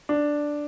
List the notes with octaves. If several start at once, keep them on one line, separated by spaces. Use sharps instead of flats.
D4